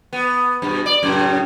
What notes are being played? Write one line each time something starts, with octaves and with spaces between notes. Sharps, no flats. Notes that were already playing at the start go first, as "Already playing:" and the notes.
B3
G2 B2
D5
F#2 A2 C#3